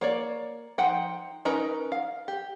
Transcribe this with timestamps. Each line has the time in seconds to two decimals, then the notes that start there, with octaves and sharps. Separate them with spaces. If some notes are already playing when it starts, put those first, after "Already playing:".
0.01 A#3 C#5 D5
0.78 F3 D#4 F#5 G5
1.45 C#4 D#4 A#4 B4 A#5
1.92 F5
2.28 G4